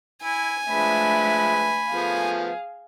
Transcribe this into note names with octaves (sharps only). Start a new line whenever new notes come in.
E4 G#5
F3 G#3 A3 D4 B4 E5 B5
F3 A3 B3 G#4 F5